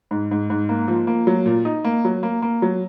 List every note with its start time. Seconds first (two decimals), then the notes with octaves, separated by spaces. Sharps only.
0.11 G#2
0.31 G#2
0.50 G#2
0.69 A#3
0.88 F3
1.07 A#3
1.27 F#3
1.46 A#2
1.65 D#4
1.84 A#3
2.05 F#3
2.23 A#3
2.42 A#3
2.62 F#3